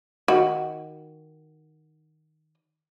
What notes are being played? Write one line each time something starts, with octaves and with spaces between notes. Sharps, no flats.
D#3 F#4